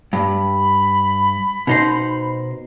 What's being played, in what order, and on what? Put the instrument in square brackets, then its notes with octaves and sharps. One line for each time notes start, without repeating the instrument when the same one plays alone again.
[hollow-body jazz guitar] G2 [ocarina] B5
[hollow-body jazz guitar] B2 D#4 C5